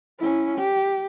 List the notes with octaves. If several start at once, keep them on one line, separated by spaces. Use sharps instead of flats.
C#4 E4
G4